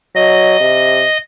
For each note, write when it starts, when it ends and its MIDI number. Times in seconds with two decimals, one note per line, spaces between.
0.15 0.56 54
0.15 1.17 75
0.61 1.04 48